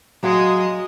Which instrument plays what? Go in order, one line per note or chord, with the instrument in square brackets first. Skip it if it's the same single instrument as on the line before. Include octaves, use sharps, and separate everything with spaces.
[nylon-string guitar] F#3 F5 F#5 [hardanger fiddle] G#3 D#5